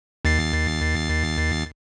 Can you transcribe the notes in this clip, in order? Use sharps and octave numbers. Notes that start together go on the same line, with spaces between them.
D#2 A6 C7